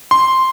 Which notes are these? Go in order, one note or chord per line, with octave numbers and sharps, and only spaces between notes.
C6